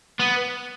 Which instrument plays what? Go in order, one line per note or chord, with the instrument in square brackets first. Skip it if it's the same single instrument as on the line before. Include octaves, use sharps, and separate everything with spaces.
[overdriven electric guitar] B3